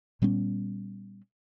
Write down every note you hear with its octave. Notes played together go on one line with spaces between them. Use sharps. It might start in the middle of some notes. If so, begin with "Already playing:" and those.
A#2 G3 B3 C#4